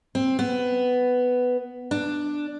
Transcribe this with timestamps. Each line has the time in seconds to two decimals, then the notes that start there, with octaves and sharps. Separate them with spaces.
0.15 C4
0.39 B3
1.91 D4